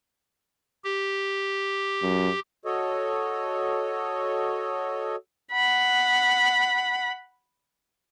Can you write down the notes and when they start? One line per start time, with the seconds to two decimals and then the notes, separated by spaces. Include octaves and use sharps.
0.84 G4
2.02 F#2
2.65 F#4 A4 C#5 D#5
5.52 F#5 B5